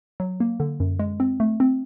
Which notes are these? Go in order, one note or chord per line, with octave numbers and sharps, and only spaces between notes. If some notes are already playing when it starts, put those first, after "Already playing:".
F#3
A#3
D3
F#2
G#3
C4
A3
C4